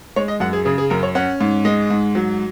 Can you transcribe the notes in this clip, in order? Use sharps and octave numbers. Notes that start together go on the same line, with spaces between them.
G#3 C#5
D#5
F#2 F#5
G#4
C#3 G#4
G#4
F#2 A#4
C#5
C#4 F#5
G#2
G#3 D#5
G#2
F#3